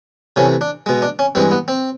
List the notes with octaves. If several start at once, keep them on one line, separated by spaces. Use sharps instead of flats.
C3 E3 A3 C#4
D4
B2 G#3
D4
C#4
G2 E3 G#3 C4
B3
C4